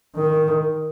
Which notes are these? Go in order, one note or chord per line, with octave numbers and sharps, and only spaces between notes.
D#3